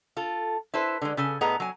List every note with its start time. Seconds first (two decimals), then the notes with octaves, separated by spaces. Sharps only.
0.17 F4 A4
0.74 E4 A4 B4 C5
1.01 D3 G#3
1.17 C#3 A4 G#5
1.41 A2 B3 G#4 D#5 F#5 A#5
1.60 F#3 G#5